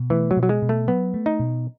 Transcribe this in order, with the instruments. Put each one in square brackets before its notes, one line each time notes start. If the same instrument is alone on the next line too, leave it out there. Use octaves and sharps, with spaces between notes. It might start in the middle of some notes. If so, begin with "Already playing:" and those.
Already playing: [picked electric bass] B2
[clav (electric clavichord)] E3 [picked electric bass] A3
[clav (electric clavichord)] F#3
[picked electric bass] B2
[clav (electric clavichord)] F#3
G#3
[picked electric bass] B2
[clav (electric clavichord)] A3
[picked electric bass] F#3 [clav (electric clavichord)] B3
[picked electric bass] A3
[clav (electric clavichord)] D#4
[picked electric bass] B2